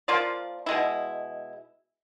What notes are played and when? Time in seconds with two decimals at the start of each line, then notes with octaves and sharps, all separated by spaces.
0.08 F3 A#3 F4 D5
0.66 B2 G#3 E4